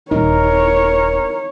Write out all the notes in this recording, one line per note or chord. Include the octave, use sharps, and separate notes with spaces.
D#1 D#4 A#4 C#5